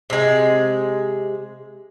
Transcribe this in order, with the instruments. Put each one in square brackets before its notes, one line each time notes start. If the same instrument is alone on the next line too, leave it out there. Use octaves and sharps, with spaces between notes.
[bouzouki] C3 G#3